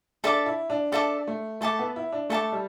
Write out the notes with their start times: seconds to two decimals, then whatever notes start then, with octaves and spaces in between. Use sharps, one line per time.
0.24 D4 A4 E5 A5 D6
0.46 E4
0.70 D4
0.92 D4 A4 E5 A5 D6
1.27 A3
1.61 A3 A4 E5 A5 D6
1.79 B3
1.96 E4
2.12 D4
2.30 A3 A4 E5 A5 D6
2.52 G3